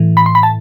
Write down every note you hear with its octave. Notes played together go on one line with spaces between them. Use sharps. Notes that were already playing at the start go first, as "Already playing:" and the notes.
Already playing: A2 E3
B5
C6
B5
A5